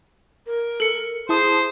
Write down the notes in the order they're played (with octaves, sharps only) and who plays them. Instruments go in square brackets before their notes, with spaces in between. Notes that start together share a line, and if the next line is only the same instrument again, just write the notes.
[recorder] A#4
[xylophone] A4 C#7
[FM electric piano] E4 A5 D#6 [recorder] G#4 [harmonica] C5